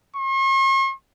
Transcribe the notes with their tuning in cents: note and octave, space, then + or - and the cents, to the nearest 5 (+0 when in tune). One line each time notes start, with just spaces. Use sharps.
C#6 -45